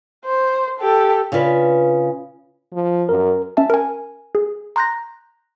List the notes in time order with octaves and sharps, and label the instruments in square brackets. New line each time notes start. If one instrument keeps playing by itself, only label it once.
[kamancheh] C5
G4 A4
[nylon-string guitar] C#3 D4 F4 B4
[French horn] F3
[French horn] F#2 [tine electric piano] A#4
[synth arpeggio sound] C#4 E5 A5
A#4 G#5
G#4
A#5 C6 F#6 G6 A#6